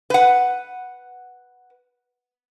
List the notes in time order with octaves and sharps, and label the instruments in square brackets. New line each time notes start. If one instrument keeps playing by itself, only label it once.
[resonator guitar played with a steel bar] B4 F#5